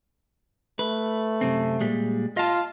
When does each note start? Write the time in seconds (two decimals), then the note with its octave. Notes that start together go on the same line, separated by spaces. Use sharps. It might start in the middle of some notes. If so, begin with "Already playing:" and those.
0.79 A3 B4
1.41 F#2 C3 C4
1.81 A#2 G3 G#3
2.37 F4 D#5 F5 A5